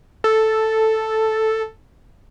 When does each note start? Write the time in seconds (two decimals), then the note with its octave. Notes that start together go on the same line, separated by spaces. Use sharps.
0.24 A4